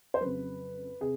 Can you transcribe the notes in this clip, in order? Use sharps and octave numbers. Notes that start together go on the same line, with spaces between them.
C5
F2 C#3 F#3 B4
C3 G#4